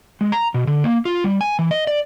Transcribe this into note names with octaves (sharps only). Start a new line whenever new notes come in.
G#3
A#5
B2
D3
A#3
F4
G3
G#5
E3
D#5
D5